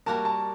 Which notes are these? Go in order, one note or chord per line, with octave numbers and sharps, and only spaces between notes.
G3 A#3 F#4 A#4 A5
A5